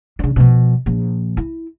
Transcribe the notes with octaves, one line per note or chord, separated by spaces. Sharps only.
C#3 D4
B2 F3
A#1 F3
E4